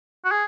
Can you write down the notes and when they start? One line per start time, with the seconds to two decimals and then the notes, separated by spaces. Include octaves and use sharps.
0.25 F#4
0.32 G#4